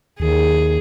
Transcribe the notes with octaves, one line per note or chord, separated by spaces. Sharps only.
D#2 G#4